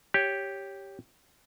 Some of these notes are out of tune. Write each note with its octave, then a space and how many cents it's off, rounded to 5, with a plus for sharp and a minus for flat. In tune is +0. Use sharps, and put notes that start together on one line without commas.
G4 +0 C#5 +0